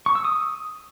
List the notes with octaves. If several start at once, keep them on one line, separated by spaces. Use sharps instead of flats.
C#6
E6
D#6